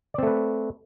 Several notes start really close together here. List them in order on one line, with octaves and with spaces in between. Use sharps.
D5 C4 A3 B4